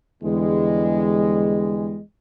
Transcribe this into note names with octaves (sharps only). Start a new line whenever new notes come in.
E2 D3 G3 G#3